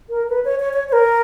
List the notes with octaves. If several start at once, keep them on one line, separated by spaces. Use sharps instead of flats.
A#4
B4
C#5
C#5
C#5
C#5
A#4